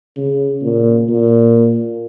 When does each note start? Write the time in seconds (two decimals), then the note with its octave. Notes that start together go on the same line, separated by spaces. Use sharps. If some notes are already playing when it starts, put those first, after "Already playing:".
0.17 C#3
0.62 A#2
1.09 A#2